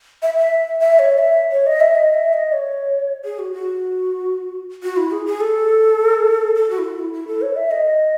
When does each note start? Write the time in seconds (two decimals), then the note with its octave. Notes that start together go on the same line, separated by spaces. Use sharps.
0.22 E5
0.38 E5
0.80 E5
0.99 C#5
1.18 E5
1.52 C#5
1.67 D#5
1.80 E5
1.95 D#5
2.14 E5
2.33 D#5
2.52 C#5
3.24 G#4
3.39 F#4
3.53 F#4
4.83 F#4
4.97 E4
5.11 G#4
5.26 G#4
5.41 A4
6.55 A4
6.70 F#4
6.78 E4
6.84 F#4
6.99 E4
7.13 E4
7.27 A4
7.42 C#5
7.56 E5
7.71 D#5